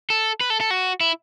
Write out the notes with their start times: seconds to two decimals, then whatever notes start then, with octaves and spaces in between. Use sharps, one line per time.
0.10 A4
0.41 B4
0.50 A4
0.61 A4
0.71 F#4
1.00 E4